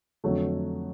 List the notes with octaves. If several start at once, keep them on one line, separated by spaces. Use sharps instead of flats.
F2 D3 F#3 A3